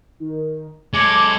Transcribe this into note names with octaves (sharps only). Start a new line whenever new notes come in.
D#3
G#3 A4 C#5 D6